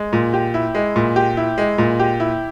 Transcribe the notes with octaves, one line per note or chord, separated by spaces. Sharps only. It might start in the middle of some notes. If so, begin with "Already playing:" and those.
Already playing: G#3
A#2
G4
E4
G#3
A#2
G4
E4
G#3
A#2
G4
E4